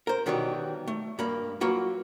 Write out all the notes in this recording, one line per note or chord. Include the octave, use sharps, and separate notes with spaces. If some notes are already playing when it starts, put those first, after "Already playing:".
A#4 C5
B2 D#3 E3 F#3 G3
A3
G2 A#3 B5
F#3 A#3 F4 F#4 B4